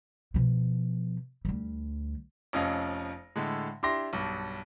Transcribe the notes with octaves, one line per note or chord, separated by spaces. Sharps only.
B2 F3
D2 G3
F1 F2 C#4 D#5 F5
A2 D3 G#3
D4 E4 G4 C6 A#6
B1 G2